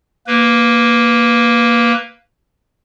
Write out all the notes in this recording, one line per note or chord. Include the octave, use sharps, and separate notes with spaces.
A#3 B4